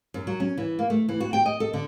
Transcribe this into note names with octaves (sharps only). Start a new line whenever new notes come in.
F#2
F#3
C#4
E3
A#3
A3
E3
F#4
G5
D#5
A4
D3